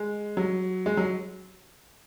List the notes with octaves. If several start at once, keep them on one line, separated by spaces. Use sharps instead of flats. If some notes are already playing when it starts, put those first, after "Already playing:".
Already playing: G#3
F#3
G#3
F#3